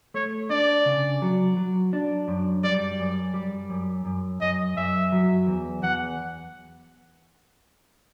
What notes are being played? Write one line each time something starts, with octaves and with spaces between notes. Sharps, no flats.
A3 C#5
D4 D5
C#3
F#3
F#3
D4
F#2
G3 D5
F#2
G3
F#2
F#2
F#2 D#5
F#2 E5
F#3
E2
E2 F#5